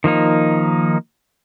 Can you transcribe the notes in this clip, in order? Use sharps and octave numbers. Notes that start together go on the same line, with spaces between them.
D#3 F3 A#3 D#4